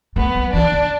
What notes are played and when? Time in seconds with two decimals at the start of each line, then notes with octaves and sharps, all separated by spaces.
0.16 A3 B3
0.35 G3
0.53 E3 D4
0.72 D3